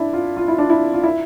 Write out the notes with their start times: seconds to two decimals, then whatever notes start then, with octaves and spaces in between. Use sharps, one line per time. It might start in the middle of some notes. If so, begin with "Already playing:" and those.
Already playing: D4 E4
0.13 F4
0.37 F4
0.48 E4
0.58 D4
0.69 E4
0.93 F4
1.03 E4